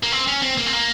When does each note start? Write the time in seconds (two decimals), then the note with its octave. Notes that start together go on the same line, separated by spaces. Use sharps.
0.03 A#3
0.12 C4
0.27 C#4
0.42 C4
0.58 A#3
0.66 C4
0.73 A#3